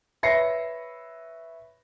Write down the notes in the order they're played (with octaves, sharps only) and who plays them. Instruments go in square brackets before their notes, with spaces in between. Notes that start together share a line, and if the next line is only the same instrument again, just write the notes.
[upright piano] B4 C#5 E5 A#6 C7 C#7